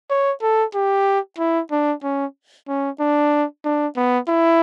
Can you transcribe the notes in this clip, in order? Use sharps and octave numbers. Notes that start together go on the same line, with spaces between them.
C#5
A4
G4
E4
D4
C#4
C#4
D4
D4
B3
E4